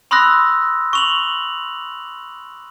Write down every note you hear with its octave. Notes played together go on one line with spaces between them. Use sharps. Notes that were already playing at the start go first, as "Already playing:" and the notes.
B5 C6 D#6 E6 F#6 A#6
C#6 F7 F#7